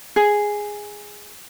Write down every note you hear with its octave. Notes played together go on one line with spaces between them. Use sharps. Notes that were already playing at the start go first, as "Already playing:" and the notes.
G#4